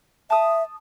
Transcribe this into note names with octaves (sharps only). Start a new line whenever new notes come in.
E5 A5 D#6